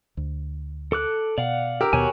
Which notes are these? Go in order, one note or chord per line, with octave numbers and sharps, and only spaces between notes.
D2
A4 D6 F#6
B2 D5 F5 F#5
G4 A#4 E6
D#2 B2 F#4 C#5 G#5